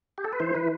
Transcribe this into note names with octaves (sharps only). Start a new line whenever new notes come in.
G4
A4
B4
E3 C5
E3 B4